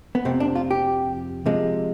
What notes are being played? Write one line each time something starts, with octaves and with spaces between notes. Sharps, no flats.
B3
F2 C3 F3 C4
D4
F4
G4
C3 F3 G#3